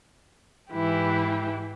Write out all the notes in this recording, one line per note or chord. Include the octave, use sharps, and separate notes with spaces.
G#2 E3 E4 G4